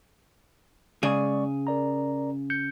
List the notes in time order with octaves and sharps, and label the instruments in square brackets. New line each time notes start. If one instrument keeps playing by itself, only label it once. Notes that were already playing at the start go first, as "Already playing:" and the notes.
[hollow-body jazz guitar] C#3 G#4 [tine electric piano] G#3 D5 C#6
[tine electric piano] A#4 D5 A#5
G6 C#7